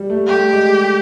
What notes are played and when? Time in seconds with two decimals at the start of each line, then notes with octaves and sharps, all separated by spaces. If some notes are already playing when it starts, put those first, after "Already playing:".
Already playing: G3
0.10 A3
0.27 A3 G4
0.53 G#3